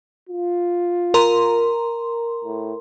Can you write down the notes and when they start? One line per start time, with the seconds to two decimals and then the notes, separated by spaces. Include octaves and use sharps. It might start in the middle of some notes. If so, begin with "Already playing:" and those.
0.29 F4
1.14 A#4 A#5 C6
2.44 A2